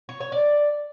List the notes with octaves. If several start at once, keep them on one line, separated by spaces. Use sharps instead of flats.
C#5
C#5
D5